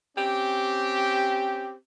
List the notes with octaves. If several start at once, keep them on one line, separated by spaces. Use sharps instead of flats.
C4 C#4 G4